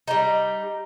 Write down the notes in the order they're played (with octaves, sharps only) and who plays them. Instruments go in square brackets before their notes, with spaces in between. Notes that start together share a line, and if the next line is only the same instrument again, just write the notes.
[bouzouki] G3 D#4